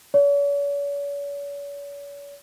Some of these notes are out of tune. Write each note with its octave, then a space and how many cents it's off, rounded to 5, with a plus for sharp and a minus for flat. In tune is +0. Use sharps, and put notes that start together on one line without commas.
C#5 +45